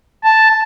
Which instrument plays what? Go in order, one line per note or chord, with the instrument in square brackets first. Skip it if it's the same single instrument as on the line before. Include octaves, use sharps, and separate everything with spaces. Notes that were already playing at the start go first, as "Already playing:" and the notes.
[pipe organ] A5